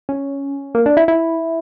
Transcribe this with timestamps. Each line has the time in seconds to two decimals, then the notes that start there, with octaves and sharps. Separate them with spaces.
0.09 C#4
0.75 A#3
0.86 D4
0.97 E4
1.08 E4